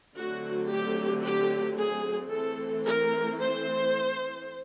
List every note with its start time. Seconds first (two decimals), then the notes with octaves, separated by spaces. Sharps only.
0.17 D3 F#3 A3 C4 F#4
0.70 G4
1.25 G4
1.78 G#4
2.32 E3 A3 C4 A4
2.86 A#4
3.39 C5